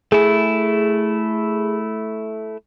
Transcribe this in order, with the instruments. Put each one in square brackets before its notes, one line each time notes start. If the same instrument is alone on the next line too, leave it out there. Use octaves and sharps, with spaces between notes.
[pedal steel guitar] A3 E4 [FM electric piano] G#4